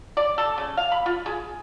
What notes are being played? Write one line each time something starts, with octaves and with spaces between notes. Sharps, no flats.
D5
A4
C#3
F5
B5
F4
G#4